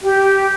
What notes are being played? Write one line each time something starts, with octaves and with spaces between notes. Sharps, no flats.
G4